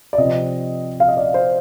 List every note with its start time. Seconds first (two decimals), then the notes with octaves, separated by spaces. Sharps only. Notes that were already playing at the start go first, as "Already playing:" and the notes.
0.13 D5
0.18 C3 F3 C4 D#5
1.00 F5
1.08 D#5
1.17 D5
1.34 C5